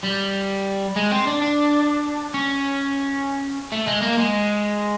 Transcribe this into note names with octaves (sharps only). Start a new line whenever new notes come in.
G3
G#3
C4
D4
D4
C#4
A3
G#3
A#3
G#3